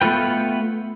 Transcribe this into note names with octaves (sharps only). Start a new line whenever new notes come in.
A3 B3 F4 B4 G5